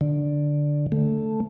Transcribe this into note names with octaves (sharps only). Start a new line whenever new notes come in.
D3
A3